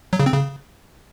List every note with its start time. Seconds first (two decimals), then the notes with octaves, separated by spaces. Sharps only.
0.13 F#3
0.20 C#3
0.26 C4
0.33 C#3